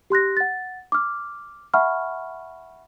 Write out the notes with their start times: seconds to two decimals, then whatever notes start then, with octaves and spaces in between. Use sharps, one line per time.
0.10 G4 C6 F#6 A#6
0.37 F#5 A6
0.92 D6 F6
1.74 E5 F#5 A5 B5 C#6 F6